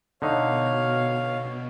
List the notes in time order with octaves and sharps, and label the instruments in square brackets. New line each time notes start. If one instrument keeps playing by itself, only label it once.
[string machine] B2 [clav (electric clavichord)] D3 D#4 [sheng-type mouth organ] C#5 F5